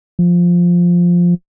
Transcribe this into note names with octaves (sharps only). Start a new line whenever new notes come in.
F3